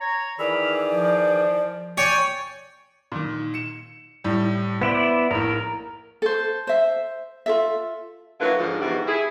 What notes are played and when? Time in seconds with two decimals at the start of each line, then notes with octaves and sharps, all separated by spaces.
0.01 C#5 A#5
0.39 D#3 E3 G#4 D5 B5 E6 F6
0.94 F3
1.98 C#5 D5 G5 G#5
3.12 A#2 D#3
3.54 C#7 E7
4.24 A2 G3
4.82 B3 E4 C5 D5
5.31 A#1 A2 A#4
6.22 A4 C5
6.67 C5 E5
7.46 F4 A4 E5
8.40 D3 F#3 A#3 E4 F4 B4
8.58 G#2 D3 F3
8.81 G#2 B2 E3 E4 F#4 G4
9.07 E4 G#4